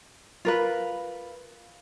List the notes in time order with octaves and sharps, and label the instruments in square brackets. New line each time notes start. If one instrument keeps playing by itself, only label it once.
[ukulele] F4 A#4 B4